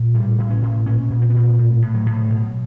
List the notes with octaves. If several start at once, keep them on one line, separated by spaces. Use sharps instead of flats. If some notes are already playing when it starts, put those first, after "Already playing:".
Already playing: A#2
A2 G3
A2
C#4
A2
A#2 C#4
A#2
C4
B3
A#2 C4
A2
A2
F#3
A2
B2